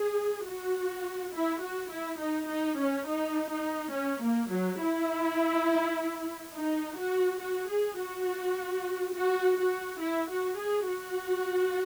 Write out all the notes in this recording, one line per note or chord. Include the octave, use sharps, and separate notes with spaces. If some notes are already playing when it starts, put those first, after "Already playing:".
Already playing: G#4
F#4
E4
F#4
E4
D#4
D#4
C#4
D#4
D#4
C#4
A#3
F#3
E4
D#4
F#4
F#4
G#4
F#4
F#4
F#4
E4
F#4
G#4
F#4